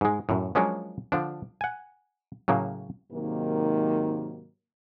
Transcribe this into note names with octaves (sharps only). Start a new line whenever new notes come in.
G#2 G#3
F#2 A2
F3 F#3 G#3 A#3 C#4 D4
D3 F3 D4
F#5 G#5
A2 C#3 F#3 A#3
G#2 C3 D#3 F#3 A#3